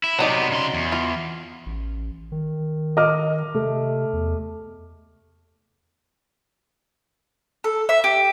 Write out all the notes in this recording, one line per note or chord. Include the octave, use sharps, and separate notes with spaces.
E4
C3 F#3 B3 D#4 D5
C#3 C6
E2
F4
A1
D#3
D#5 D6 F6
C3 A3
E2
A4
E5
G4